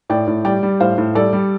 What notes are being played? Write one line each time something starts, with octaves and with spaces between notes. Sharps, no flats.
A2 D5 G5
A2
G3 D5 G5
G3
A2 C5 F5
A2
G3 A4 D5
G3